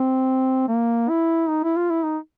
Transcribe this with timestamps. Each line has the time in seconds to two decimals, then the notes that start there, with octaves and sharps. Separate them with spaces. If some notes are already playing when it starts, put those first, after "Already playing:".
Already playing: C4
0.68 A#3
1.09 E4
1.49 D#4
1.64 E4
1.76 F4
1.90 E4
2.04 D#4